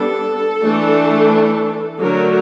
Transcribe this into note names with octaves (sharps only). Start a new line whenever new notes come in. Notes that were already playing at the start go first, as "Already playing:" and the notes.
Already playing: G3 B3 D4 A4
E3 A3 D4
D3 F#3 A3 A#4